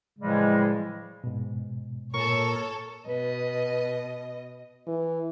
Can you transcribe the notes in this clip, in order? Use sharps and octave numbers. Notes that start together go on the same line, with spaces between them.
A2 C#3 E3 F3 G3 G#3
G#2 B2
A#2 A4 A#4 C#5 C#6
B2 B4 D#5
E3